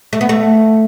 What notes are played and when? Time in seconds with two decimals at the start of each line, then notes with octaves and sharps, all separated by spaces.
0.13 A3
0.21 B3
0.29 A3